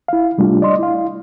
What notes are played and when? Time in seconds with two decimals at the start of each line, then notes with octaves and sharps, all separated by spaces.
0.08 E4 F5
0.38 C3 G3 A3 D4 F4
0.62 D5 D#5 C6
0.79 E4 F5